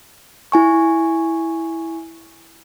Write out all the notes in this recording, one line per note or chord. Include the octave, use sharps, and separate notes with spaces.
E4 G#5 C#6